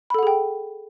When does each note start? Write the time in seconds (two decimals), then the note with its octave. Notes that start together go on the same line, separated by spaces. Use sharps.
0.10 B5
0.14 A4
0.19 F#5
0.23 G#4
0.27 G5